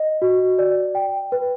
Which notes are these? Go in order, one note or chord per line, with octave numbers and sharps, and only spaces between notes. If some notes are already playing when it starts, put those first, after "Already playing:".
Already playing: D#5
F#4
D5
G5
B4